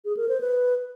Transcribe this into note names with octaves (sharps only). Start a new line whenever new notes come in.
G#4
A#4
C5
B4